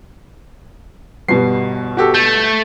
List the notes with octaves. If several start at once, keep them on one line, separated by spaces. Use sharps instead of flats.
G1 B2 G3 C7
F#4 G4 A4
A3 G6